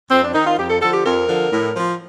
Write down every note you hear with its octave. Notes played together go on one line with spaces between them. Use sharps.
F2 C4
D4
D#3 D#4
F4
F2 G4
A4
D3 F3 A4
G4
F2 A#4
D3 F3
A2
F3